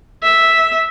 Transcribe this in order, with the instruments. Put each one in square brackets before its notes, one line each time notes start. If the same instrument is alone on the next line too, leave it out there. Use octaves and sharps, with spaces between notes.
[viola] E5